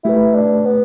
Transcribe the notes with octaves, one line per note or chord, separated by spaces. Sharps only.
A3 E4 G4 B4
D4
B3